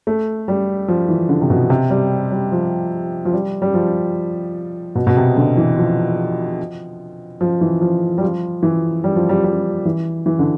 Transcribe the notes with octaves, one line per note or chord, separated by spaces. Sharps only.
A3
G3
F3
E3
D3
C3
B2
C3
G3
G3
F3
F3
G3
G3
F3
B2
B2
C3
D3
E3
F3
F3
E3
F3
G3
F3
E3
G3
F3
G3
G3
E3
E3
D3